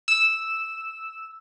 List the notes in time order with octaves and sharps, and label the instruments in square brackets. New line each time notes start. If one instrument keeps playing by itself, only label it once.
[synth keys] E6 E7